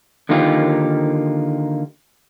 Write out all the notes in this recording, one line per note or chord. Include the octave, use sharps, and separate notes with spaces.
D3 D#3 A#3 D#4 F4 G4